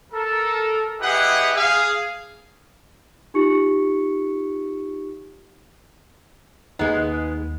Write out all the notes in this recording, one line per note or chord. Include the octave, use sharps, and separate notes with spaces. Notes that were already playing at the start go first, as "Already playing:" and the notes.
A4 A#4
E4 G4 G#4 B4 D#5 F#5
G#4 F5
D#4 F4 G4 C#6 C#7
D#2 G#3 B3 D#4